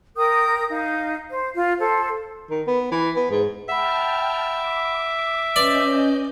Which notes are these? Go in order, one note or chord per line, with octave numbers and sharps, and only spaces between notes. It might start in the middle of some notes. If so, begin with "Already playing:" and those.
A#4 G5 D#6 G6
D#4 F5
C5
F4
A4 C5
D#3
B3
E3
B3
G#2
E5 F#5 G5 A5 B5 F6
D6
C#4 B4 D5 D#5 G6